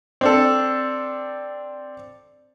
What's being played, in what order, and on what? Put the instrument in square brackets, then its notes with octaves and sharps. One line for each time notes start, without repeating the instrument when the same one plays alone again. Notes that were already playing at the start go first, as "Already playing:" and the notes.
[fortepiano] C4 D4 A4